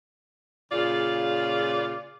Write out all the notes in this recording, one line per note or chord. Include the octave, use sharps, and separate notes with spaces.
A#2 C#3 F4 G#4 D5